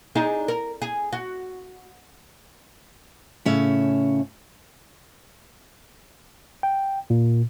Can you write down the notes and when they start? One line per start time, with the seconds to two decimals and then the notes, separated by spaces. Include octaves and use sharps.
0.15 D4 D#4 G#4
0.48 A#4
0.82 G#4
1.13 F#4
3.45 A2 C#3 C#4 C#5 E5
6.63 G5
7.10 A#2